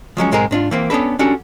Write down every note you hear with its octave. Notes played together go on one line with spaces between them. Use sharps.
F3 F#3 G#3 C#4
B1 G#2 G#3 C4 G#4 A#4
G#2 D4 F4
E3 A#3 C4
B3 C#4 D4 A4 B4
C#4 D4 F#4 G4 A4